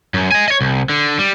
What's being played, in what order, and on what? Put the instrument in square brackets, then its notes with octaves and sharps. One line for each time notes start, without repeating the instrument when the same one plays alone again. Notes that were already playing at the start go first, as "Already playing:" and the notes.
[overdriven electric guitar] F#2
D#5 G#5
C#5 D#5
C2
D3
G3